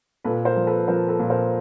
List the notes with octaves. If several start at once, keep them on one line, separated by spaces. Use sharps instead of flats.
A#2 A4 B4
A#4 C5
F3
A4 B4
F3 A#4 C5
A4 B4
A#2
A#4 C5